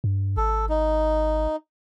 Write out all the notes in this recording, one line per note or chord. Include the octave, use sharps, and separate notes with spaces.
G2
G#1 A4
D#4